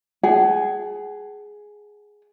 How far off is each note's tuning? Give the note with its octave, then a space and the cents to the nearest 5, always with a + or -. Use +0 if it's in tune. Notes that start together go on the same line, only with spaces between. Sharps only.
G#4 +5 F#5 +35 A5 -20